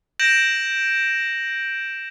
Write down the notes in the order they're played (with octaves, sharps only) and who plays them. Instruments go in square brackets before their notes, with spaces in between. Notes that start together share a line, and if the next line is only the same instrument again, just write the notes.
[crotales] G6 A#6 D7 E7 F#7